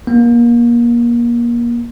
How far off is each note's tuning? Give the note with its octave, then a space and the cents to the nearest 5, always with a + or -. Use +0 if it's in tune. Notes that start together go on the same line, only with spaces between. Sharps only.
A#3 +30